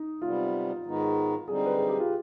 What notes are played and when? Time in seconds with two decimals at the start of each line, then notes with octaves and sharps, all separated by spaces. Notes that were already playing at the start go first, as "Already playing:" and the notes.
Already playing: D#4
0.21 C3 G3 B3 F4
0.85 G#2 D#3 G#3 B3 D#4
1.47 D3 G3 C4 D#4 G#4
1.66 B4
1.78 G#4
1.89 G4
2.00 F4